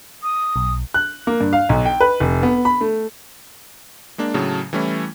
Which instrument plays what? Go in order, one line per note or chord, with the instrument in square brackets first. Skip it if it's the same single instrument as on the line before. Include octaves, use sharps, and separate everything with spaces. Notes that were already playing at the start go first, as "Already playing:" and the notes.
[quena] D#6
[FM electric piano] B1
[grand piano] F#6
A#3
G2
F5
B1
G5
B4
F1
B3
B5
A3
[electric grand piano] G#3 A#3 D4
A2 C#3 F#3 A5
E3 G3 A3 C#4 E4